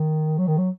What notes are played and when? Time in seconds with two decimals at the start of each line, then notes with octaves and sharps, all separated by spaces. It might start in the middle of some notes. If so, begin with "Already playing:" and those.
Already playing: D#3
0.38 F#3
0.47 D#3
0.58 F#3